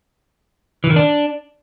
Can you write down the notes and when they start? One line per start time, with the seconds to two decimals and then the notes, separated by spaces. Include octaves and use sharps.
0.84 E3
0.90 D#3
0.96 D4